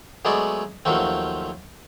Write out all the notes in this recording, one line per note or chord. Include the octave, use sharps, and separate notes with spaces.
F#3 G#3 A3 B3 G#4 D5
D#2 F3 F#3 A3 C4